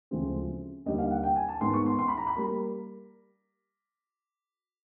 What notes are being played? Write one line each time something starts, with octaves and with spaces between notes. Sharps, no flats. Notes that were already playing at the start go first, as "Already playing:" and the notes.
D2 C#3 F3 G#3 C4
D#2 D3 G3 D#5
F5
F#5
G5
G#5
A5
G#2 D#3 G#3 B3 C6
C#6
C6
C6
B5
A#5
B5
G3 A#3